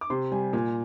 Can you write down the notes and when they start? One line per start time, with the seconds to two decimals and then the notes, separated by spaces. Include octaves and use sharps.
0.01 D6
0.10 C3 C6
0.32 G3 G#5
0.53 A#2 G#5